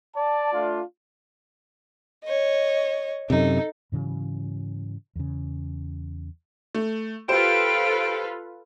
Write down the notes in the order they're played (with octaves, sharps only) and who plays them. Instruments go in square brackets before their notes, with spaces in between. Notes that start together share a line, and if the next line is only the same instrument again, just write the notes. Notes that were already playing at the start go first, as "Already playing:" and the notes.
[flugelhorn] D5 [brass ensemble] A5
[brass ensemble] A3 D4 F4
[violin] C#5 D#5
[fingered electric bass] F#2 C3 [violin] D#4 A4
[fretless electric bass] G#2 C#3 E3 F#3
E2 C#3
[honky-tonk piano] A3
[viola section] F4 A4 B4 [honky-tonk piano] G4 C5 [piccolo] D7